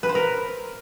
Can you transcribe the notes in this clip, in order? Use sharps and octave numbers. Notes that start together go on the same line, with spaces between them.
B4
C5
A#4